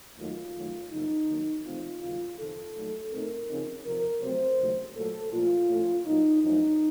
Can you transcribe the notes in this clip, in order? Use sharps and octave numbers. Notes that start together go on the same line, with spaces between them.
D#2 D#3 F#3 A3 D#4 F4
F#2 D#3 F#3 A3
F#2 C#3 F3 A#3 D#4
D#2 D#3 F#3 A#3
C3 F3 A3 C4 D#4 F4
D#2 C#3 F#3 A#3 F4
F2 C3 D#3 A4
A#2 F#3 A3 D#4
A#2 A3 C4 D#4 A#4
C#3 F3 C4 D#4
F2 C3 F3 A#4
C3 F#3 A3 C4 C5
D#2 C#3 F#3 A3
A#2 F#3 A3 A4
A#2 F3 A3 F4
A2 F3 A3 C#4
A#2 F#3 A#3 D#4
F#2 F3 A3 D#4